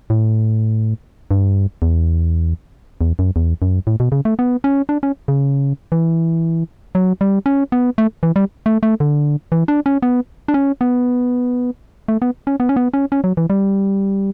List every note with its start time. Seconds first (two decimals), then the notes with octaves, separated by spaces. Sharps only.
0.10 A2
1.31 G2
1.82 E2
3.01 E2
3.19 F#2
3.36 E2
3.62 F#2
3.87 A2
4.00 B2
4.12 C#3
4.25 A3
4.39 B3
4.64 C#4
4.89 D4
5.03 C#4
5.28 C#3
5.92 E3
6.95 F#3
7.21 G3
7.46 C#4
7.72 B3
7.98 A3
8.23 E3
8.36 G3
8.66 A3
8.83 A3
9.00 D3
9.52 E3
9.68 D4
9.86 C#4
10.02 B3
10.48 D4
10.54 C#4
10.81 B3
12.08 A3
12.22 B3
12.47 C#4
12.60 B3
12.69 C#4
12.76 B3
12.94 C#4
13.12 C#4
13.24 F#3
13.37 E3
13.50 G3